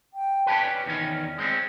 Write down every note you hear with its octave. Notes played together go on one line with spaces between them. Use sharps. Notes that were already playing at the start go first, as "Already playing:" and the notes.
G5
C#4 G4 B4 A5
D5
E2 D#3 C#4
G#3 C4 C#4